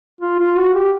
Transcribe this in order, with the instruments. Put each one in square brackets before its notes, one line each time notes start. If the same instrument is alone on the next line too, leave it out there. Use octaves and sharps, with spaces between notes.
[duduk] F4
F4
F#4
G4